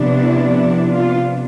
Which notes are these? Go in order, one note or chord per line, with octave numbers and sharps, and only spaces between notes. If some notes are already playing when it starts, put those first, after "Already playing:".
Already playing: C3 F3 B3 D4
E4
E4
F4